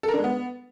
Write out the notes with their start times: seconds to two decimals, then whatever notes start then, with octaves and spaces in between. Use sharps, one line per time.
0.03 A4
0.08 A#4
0.14 D4
0.19 G#3
0.24 B3